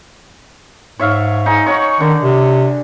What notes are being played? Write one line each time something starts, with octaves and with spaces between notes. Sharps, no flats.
G#2 C#5 E5 F5
D#4 G#4
C#5 F#5 C#6
D3 D#3
C3